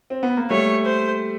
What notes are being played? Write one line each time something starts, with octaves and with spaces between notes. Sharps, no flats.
C4
B3
A#3
G3 A3 C#5
C5